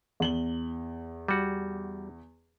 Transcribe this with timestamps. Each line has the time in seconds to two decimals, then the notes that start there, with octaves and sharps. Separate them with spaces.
0.20 E2 F#7 G7
1.28 G3 F#4